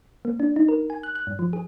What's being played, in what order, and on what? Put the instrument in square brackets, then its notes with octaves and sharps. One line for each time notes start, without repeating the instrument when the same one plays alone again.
[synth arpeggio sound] A#3
D4
D#4
A#4
G#5
F#6
F#6
G2
F3
G#4